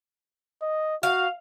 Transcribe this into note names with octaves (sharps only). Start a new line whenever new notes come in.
D#5
F#4 F5